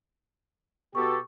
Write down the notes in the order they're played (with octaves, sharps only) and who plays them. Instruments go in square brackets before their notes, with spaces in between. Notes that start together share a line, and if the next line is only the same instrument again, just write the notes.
[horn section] B2 G4 A4 [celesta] C#6